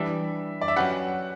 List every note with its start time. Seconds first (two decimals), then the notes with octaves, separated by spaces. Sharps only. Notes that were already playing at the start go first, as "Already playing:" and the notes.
Already playing: E3 G3 D4 E5
0.61 D5
0.68 E5
0.76 F#3 C#4 G4 B4 F#5